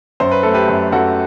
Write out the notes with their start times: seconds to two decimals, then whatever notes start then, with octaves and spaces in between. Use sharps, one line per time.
0.20 F#2 C5
0.31 B4
0.43 A3 A4
0.54 G4 B4
0.68 F#2
0.92 F#2 F#4 A4